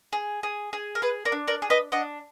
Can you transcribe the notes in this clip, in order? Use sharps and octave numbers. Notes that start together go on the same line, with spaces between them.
G#4
G#4
G#4
A#4
G#4 B4
A#4 D5
D4
A#4 D5
G#4
B4 D#5
D4 D#5 F#5